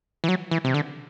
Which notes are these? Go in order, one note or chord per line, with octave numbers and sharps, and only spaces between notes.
E3
F#3
E3
C3
D3